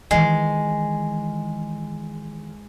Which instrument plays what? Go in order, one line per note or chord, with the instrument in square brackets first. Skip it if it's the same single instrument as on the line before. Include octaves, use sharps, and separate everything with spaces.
[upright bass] D#3 E3 [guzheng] G#3